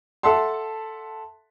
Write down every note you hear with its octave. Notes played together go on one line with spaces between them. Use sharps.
A4 E5 F#5 A5 C6